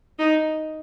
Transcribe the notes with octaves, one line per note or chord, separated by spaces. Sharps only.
D#4